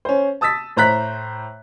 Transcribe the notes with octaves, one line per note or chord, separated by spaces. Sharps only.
C#4 C5
A5 D#6 E6 A6 B6
A2 C5 A#5 F#6 B6